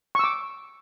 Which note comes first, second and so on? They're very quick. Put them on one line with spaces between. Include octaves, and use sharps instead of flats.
C#6 E6 D6